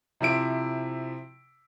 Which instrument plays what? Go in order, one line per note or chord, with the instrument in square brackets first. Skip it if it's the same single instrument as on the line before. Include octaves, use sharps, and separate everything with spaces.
[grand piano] C3 F3 E4 D7